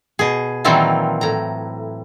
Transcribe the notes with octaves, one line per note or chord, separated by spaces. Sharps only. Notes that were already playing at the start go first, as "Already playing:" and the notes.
B2 G#4
A#2 D#3 E3 F#3 C4 F4
A2 A#5